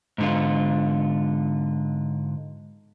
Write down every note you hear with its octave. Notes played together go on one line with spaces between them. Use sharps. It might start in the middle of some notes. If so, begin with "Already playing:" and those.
G#2 D3 F4